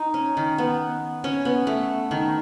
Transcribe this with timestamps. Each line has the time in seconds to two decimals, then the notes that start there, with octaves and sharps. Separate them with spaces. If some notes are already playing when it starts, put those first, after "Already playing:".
Already playing: D#4
0.14 C#4
0.37 D#3
0.58 B3
1.24 C#4
1.45 B3
1.67 A3
2.11 D#3